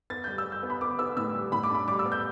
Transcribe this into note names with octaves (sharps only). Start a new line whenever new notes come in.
B3 A6
G3 G6
E6
G3
G6
B3
B5
B3 D6
B3 E6
A2 E6
G3
A2 B5
D6
D4 B5
G3 D6
E6
B3
G6